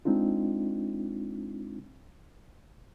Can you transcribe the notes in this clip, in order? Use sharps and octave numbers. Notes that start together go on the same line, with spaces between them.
G#3 C4 D4 D#4 F4